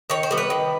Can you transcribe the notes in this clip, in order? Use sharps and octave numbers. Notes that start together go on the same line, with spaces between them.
D#3 C#5
C5
G3 B3
B4
D#3